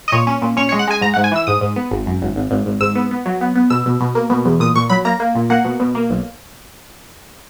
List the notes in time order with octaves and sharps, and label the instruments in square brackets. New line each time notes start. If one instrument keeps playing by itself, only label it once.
[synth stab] D#5
A#2 C#5
C#4
A#2
C#4 C#5
C#5
G#3
F#5
G#3 G#5
G#2 A#5
F#5
G#2
G#5
E3 E6
G#2 D#6
G#2
B3
G#1
F#2
G#1
G#1
G#1
G#1
G#2 E6
B3
B3
F#3
B3
B3
B2 E6
B2
B2
A#3
B2
E2
A#2 D#6
A#2 C#6
F#3 B5
A#3 A#5
A#3
A#2
A#3 F#5
B2
B2
A#3
B1